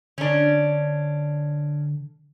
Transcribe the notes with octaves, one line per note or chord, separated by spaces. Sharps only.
D3 C#4 D4